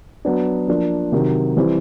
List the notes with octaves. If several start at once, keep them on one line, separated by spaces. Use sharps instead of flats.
F#3 B3 D4
F3 A#3 D4
C3 D#3 F#3
E3 G3 C4